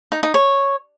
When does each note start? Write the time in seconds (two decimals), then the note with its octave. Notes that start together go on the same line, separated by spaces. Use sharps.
0.12 D#4
0.23 D#4
0.34 C#5